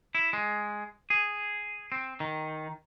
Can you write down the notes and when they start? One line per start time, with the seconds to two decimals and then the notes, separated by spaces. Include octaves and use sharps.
0.15 E4
0.33 G#3
1.10 G#4
1.92 C4
2.20 D#3